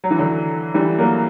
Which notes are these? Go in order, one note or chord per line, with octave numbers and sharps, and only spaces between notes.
F#3
E3
D3 F#3
E3 G3
F#3 A#3